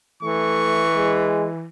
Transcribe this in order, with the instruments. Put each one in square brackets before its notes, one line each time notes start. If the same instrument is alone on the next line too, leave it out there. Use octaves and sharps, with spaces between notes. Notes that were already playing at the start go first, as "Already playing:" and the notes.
[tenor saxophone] E3 [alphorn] A3 [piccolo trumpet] C#6
[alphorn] G#3